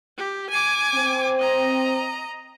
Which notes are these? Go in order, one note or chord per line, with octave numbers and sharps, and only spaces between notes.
G4
G#5 D6
C4
D#5 A#5